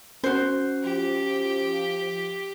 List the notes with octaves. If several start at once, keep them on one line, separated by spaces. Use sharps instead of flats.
C#4 F#4 C5
F3 G4